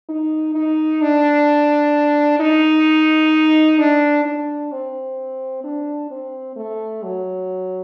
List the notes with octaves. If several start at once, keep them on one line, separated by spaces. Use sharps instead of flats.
D#4
D#4
D4
D#4
D4
D4
C4
D4
C4
A3
F#3